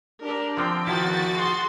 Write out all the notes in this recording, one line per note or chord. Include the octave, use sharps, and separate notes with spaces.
D4 G4 A#4
D3 F3 C4 G5
E2 D#3 F3 E4 F#4 A6
G#4 C6